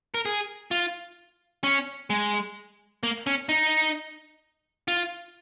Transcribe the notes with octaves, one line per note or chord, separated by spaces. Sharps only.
A#4
G#4
F4
C#4
G#3
A#3
C#4
D#4
F4